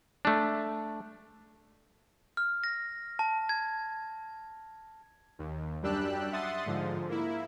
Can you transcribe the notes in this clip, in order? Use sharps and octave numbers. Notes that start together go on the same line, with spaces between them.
A3 D4
F6
A#6
A5
G#6
D#2
F#2 G3 D4 G4 E6 F#6
E5 F#5 C6 D#6 A6
G#2 D3 F3
A#3 E4